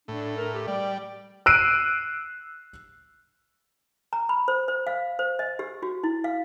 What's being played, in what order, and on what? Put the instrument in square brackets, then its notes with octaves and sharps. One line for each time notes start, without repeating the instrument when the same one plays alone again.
[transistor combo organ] A2 [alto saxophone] D4
[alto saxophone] A#4
G4
[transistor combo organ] G3 [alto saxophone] D5
[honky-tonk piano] E6 F#6 C7 D7 D#7
[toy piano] A#5
B5
C5
C5
F5
C5
D#5
G4
F#4
E4
F5